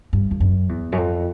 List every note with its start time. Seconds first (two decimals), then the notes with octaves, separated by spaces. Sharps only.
0.13 G2
0.31 F2
0.40 F#2
0.69 E2
0.92 F#2
0.98 F2